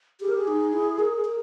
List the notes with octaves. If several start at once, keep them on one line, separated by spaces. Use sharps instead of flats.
G4 G#4
A#4
G#4
D#4
E4
A#4
A#4